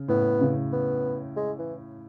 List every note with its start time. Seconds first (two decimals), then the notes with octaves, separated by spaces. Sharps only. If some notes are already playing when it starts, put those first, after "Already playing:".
Already playing: C#3
0.08 A2 B3
0.41 C#3
0.73 B3
1.37 G#3
1.59 E3